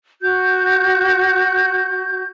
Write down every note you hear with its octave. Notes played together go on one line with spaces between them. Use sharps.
F#4 G6